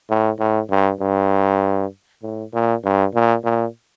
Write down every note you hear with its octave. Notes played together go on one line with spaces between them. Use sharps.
A2
A2
G2
G2
A2
A#2
G2
A#2
A#2